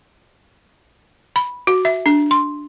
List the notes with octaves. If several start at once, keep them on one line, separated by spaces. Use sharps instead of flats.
B5
F#4
E5
D4
C6